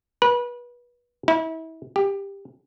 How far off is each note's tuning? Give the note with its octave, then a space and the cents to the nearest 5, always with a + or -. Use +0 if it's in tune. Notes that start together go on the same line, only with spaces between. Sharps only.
B4 -30
E4 -35
G4 +15